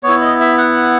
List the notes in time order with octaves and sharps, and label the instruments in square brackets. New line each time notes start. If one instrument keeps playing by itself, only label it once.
[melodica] B3 E4 C#5
D#5
E5
F#5